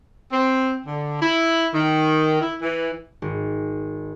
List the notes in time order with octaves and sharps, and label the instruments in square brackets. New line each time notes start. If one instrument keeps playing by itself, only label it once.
[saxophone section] C4
D3
E4
D#3
E4
E3
[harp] G#1